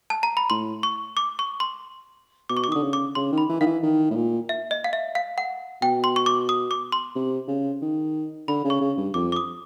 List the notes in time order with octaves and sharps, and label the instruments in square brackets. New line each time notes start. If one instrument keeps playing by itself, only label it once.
[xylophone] A5
A#5
B5
[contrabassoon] A2 [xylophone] C6
[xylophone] C#6
D6
C#6
C6
[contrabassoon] B2 [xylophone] D6
[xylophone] C#6
D6
[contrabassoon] D#3
[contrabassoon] D3 [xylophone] D#6
[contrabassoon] C#3
[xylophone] D6
[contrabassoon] C#3 [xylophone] C6
[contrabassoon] D#3
[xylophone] B5
[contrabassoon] E3
[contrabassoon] D#3 [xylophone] F5
[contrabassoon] E3
D#3
A2
A#2
[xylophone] E5
D#5
F5
E5
F5
F#5
[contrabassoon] B2 [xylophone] G5
[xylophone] C6
C#6
D6
D#6
D6
C6
[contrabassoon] C3
C#3
D#3
[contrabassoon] D3 [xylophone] B5
[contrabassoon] C#3
[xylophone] C#6
[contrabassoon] C#3
G2
[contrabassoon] F2 [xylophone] D6
[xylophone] D6
D#6